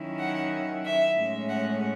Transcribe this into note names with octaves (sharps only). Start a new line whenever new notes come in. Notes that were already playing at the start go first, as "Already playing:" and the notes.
Already playing: D#3 F#3 C#4 E4
F#5
E5
A2 G#3 C#4
F#5